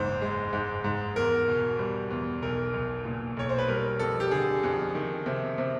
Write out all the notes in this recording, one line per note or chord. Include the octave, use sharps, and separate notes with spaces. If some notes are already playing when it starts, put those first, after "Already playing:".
Already playing: F#1 E2 G#2 C5
G#3
G#2
G#2
E2 A#4
B2
G3
E2
B1 A#4
B1
A#2
B1 C#5
C5
B4
G3 A#4
F2 A4
G4
D3 G#4
F2
D#3
C3
C3